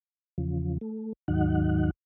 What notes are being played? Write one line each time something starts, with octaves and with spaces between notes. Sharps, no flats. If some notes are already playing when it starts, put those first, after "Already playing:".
E2 C#3 F3
A3
D#2 G#2 D#3 F#3 D#4 F#5